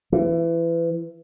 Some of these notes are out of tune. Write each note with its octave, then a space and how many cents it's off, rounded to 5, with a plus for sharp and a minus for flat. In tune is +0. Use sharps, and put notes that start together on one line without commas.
E3 +25